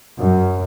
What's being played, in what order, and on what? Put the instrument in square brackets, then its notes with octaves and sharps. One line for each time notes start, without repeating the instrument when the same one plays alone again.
[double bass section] F#2